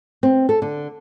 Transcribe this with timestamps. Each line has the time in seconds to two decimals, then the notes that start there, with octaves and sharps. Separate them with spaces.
0.23 C4
0.49 A4
0.62 D3